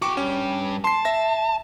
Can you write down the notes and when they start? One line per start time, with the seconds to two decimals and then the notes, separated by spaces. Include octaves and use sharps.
0.02 F#4 G5 C#6 D6
0.17 G2 C#4 G4
0.84 A5 C6 C7
1.05 E5 A#6